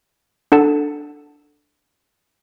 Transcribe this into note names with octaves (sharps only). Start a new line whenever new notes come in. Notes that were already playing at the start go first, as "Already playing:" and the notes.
D4 A4 F#5 A5